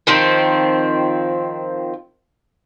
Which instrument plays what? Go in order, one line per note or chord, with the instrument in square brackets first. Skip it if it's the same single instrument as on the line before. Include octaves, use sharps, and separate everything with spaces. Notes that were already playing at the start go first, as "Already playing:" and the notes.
[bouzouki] D#3 F3 C4